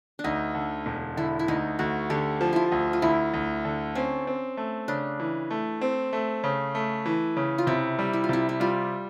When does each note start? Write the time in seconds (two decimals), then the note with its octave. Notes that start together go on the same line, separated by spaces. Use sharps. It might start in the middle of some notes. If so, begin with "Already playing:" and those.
0.19 D4
0.24 D2 D#4
0.55 D3
0.86 E1
1.17 D3 E4
1.39 E4
1.48 D2 D#4
1.79 D2 F#4
2.10 D3 G4
2.41 F3
2.53 E4 F4
2.72 D2
2.93 F4
3.02 D2 E4
3.34 D2
3.65 D3
3.95 C4 C#4
4.27 C4
4.57 A3
4.88 C#3 D4
5.20 E3
5.50 A3
5.81 C4
6.13 A3
6.44 C#3
6.75 A3
7.06 E3
7.37 C#3
7.58 F4
7.67 C3 E4
7.99 G3
8.13 E4
8.24 F4
8.29 C3 E4
8.49 E4
8.60 G3 F4